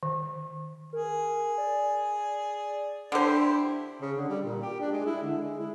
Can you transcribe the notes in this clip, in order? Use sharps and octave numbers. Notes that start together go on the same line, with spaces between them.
D#3
G#4 A#4
D5
D3 E4 G4 C5
C#3
D3
G3
A#2
G4
D4
G#3
E4
D3
G#3
E4